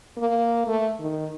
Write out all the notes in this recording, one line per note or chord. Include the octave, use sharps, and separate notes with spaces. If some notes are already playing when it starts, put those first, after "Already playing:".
A#3
A3
D#3